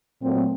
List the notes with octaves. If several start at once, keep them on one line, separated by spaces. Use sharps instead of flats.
A#2 F#3 A3 C4